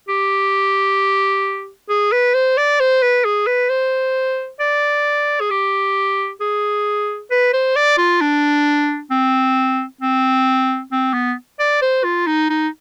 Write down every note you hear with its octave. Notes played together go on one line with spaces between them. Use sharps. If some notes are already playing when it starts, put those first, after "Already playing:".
G4
G#4
B4
C5
D5
C5
B4
G#4
B4
C5
D5
G#4
G4
G#4
B4
C5
D5
F4
D4
C4
C4
C4
B3
D5
C5
F4
D#4
D#4